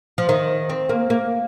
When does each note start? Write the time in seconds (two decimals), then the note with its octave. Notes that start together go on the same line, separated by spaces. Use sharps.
0.18 F3
0.29 D#3
0.69 C4
0.89 A#3
1.10 A#3